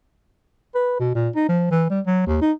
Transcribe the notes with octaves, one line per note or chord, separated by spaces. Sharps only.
B4
B2
A#2
D#4
F3
E3
G3
F#3
D#2
D#4